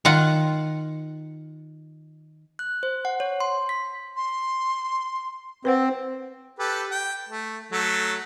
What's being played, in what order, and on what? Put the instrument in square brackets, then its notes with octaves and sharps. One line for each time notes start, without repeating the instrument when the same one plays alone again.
[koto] D#3 F4 F#5
[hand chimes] F#6
C5
F#5
C#5
C6
B6
[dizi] C6
[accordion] C4 [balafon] B4 C5 F#5
[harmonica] G4 A4 B4
G5
A3
F#3 A3 A4